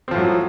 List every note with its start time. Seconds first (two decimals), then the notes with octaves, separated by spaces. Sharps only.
0.08 C4
0.11 F3
0.15 A2
0.18 F#3